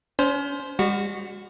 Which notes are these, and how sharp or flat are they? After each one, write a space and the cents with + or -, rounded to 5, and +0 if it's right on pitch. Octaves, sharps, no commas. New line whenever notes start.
C#4 +35 C5 +0
G3 +45 F#4 +0